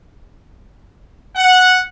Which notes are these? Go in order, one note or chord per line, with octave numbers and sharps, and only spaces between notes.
F#5